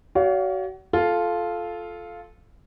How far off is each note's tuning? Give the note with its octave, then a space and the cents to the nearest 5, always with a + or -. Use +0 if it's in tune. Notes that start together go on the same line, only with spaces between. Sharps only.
F#4 +30 C#5 +45 F5 +0
F4 +0 A4 -15 F5 +0